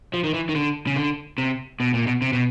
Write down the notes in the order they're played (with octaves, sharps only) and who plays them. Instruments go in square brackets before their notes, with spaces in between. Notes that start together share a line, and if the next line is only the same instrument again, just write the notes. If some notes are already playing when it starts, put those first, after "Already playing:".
[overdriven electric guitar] F3
D#3
E3
D#3
D3
C#3
D3
C3
B2
A#2
B2
C3
B2